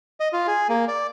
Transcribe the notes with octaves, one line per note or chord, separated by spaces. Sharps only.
D#5
F4
G#4
A#3
D5